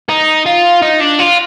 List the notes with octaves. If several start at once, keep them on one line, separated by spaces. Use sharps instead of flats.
D#4
F4
D#4
D4
F4